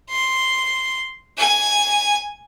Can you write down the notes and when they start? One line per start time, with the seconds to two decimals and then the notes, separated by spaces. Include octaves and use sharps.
0.10 C6
1.38 G#5